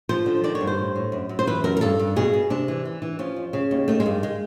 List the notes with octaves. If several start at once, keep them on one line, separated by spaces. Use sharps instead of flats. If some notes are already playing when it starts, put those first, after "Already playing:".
F3 C5
D3
D#3 D5
C#5
G2
C5
A2
A2
F#2
F#2
C5
E3 B4
F#2 A#4
A#4
G2 A4
G2
B2 G#4
B2
C3 D4
E3
E3
E3
F3 C#4
F2
C#3
D#2
D#3 A3
G#3
G2
G#3